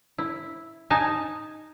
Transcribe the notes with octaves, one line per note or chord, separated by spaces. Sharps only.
E4
D#4 G#5 A5